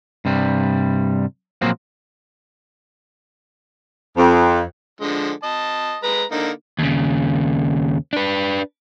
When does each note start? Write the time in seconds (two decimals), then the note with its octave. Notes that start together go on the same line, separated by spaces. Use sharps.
0.25 G2 C3 G3
1.62 A#2 F3 F#3 A#3 C4
4.17 F2
5.01 D3 F3 G#3
5.43 D#5 A5
6.03 G#3 B4 A#5
6.32 D3 A#3 D#4
6.79 D#2 C#3
8.13 D4 B4